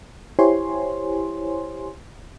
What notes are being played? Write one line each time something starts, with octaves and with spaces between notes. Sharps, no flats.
E4 G4 C5 C#5 G#5 C6